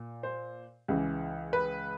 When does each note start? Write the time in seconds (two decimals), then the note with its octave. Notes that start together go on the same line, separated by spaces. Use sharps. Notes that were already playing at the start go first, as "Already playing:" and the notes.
Already playing: A#2
0.23 C5
0.88 C#2 C#3 E3
1.53 B4